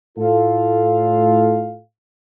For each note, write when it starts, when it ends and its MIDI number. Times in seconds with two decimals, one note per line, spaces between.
0.18 1.80 45
0.18 1.80 65
0.18 1.80 69
0.18 1.80 77